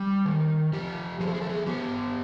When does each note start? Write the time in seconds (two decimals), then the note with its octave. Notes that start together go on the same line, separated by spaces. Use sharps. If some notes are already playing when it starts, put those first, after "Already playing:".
Already playing: G3
0.25 D#3
0.73 F3 G4
1.20 F3 G#4
1.27 A4
1.35 G#4
1.41 A4
1.49 G#4
1.66 B3 G4